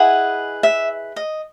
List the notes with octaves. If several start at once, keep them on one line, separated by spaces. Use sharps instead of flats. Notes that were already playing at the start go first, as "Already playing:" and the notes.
Already playing: E4 G#4 B4 D#5 F#5
E5
D#5